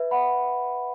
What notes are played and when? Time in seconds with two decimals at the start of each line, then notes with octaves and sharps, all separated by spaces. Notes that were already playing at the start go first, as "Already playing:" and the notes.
Already playing: B4 E5
0.11 F#5 B5